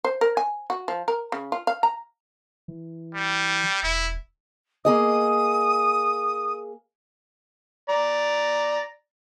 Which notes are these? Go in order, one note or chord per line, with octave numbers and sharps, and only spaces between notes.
C5
A#4
G#5
F#4
F3
A#4
C#3
F4
F5
A#5
E3
G3
E1 E4
A#3 G#4 D#5 D#6
D5 A#5